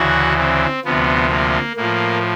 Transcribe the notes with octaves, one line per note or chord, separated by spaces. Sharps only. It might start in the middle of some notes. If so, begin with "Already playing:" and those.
Already playing: D2 C#3 E3 F#4
C4
D2 C3 F3 B3
A#3
A2 F3 A#3